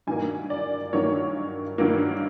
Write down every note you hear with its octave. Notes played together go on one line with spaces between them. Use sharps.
G2 D#3 F#3 A#3 G#5
D5
G2 D#3 F#3 A#3 C#5
G2 D#3 F#3 A#3